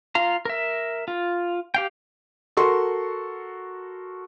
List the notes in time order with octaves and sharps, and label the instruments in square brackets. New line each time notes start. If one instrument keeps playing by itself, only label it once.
[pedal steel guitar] F4 F5 A#5
A#4 E5
F4
G4 F5 G5
[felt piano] F#4 A4 A#4 C6 C#6